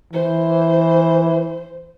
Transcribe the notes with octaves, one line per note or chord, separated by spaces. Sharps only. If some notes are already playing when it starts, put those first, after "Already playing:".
E3 C5